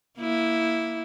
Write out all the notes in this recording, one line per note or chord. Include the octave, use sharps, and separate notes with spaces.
A#3 E4